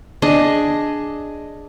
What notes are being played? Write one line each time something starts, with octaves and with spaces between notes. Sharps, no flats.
D4 G#4 D#5